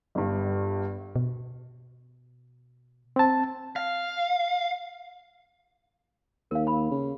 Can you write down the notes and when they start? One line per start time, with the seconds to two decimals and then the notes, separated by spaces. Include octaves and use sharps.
0.15 G1 G2
1.16 B2
3.16 C4 A5
3.76 F5
6.51 D#2 A#4 F5
6.67 B5
6.91 C#3